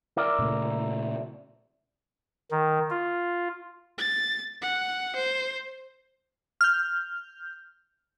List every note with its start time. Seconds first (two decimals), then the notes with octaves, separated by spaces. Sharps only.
0.17 E4 A#4 D5
0.39 A#2 C#3 A3
2.51 D#3
2.90 F4
3.98 A6
4.62 F#5
5.16 C5
6.61 F6 G6